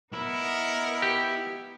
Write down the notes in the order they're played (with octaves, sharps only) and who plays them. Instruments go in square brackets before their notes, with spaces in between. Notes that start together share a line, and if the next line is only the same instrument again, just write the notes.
[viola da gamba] B3 D#4 [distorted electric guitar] E4 [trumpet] A#4
[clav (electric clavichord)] G4